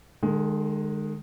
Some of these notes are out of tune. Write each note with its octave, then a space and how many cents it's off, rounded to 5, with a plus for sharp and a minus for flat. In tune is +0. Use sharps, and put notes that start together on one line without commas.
D#3 -40 G#3 +0 A4 +0